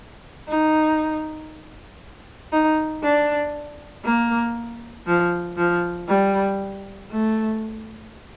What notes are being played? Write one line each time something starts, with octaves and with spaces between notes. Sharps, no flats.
D#4
D#4
D4
A#3
F3
F3
G3
A3